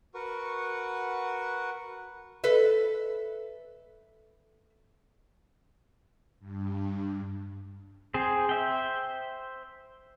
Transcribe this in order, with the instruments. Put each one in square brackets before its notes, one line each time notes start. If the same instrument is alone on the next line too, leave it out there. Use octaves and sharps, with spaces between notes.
[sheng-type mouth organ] F#4 A#4 B4 F#5 C#6
[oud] A4 B4 E5
[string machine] G2
[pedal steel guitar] C4 G#4 C5
C5 E5 G5